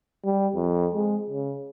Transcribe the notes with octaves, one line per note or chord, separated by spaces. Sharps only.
G3
F2
G#3
C#3